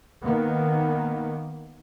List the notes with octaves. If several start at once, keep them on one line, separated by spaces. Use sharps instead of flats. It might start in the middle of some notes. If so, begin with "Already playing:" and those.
D#3 A#3 B3